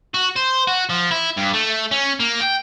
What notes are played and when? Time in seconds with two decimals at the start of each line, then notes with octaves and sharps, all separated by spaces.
0.14 F#4
0.36 C5
0.67 F#4
0.89 F3
1.11 E4
1.37 G2
1.54 A3
1.91 C#4
2.20 A#3
2.41 G5